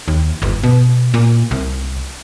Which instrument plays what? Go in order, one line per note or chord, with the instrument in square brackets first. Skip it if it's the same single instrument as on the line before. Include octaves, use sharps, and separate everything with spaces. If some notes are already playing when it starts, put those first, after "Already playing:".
[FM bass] D#2
G1
B2
A#2
C2